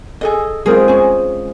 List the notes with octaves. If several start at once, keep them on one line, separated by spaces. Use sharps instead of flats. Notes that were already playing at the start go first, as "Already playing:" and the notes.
G#4 A4 D#5
G#3 C4 F4 G#4 A#4
C#4 G#4